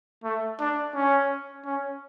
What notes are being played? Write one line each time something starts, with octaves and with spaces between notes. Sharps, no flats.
A3
D4
C#4
C#4